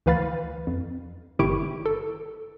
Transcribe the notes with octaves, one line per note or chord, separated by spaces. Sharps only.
D2 E3 B4 F5 B5 A6
F2
G1 D#3 E4 G4 C#6 D7
A4